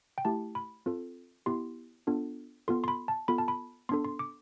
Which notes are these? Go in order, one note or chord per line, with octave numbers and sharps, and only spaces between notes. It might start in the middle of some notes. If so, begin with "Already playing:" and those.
G5
A3 E4 G4 A5
B5
C4 F4 A4
B3 E4 G4 C6
B3 D4 F4 A4
B3 F4 A4 C6
C6
B5
A5
B3 F4 A4 B5
A5
B5
B3 D4 A4 C6
C6
D6